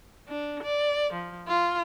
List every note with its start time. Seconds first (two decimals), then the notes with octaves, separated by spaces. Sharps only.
0.28 D4
0.63 D5
1.13 F3
1.48 F4